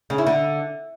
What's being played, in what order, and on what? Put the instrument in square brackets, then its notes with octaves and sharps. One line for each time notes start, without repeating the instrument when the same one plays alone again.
[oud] C#3
E4
D3